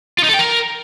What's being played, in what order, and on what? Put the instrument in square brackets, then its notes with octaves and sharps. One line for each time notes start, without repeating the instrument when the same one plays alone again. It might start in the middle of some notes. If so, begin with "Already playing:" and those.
[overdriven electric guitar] F4
D#4
A4
G5
A#4